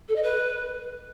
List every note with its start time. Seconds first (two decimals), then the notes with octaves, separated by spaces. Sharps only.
0.08 A4
0.15 D#5
0.22 B4